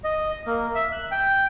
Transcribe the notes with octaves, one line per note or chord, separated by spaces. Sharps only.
D#5
A#3
E5
F#6
G5